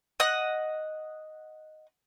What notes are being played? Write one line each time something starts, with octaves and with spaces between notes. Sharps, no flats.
D#5 F#5 F#6